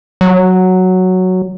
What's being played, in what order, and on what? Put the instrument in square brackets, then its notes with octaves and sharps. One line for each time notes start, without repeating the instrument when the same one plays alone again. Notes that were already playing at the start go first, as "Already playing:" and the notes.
[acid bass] F#3